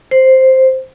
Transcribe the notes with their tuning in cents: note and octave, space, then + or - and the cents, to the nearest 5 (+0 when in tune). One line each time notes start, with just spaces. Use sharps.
C5 +0